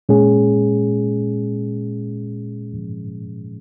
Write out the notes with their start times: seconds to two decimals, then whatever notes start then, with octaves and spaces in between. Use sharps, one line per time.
0.09 A#2 G#3 C#4 G#4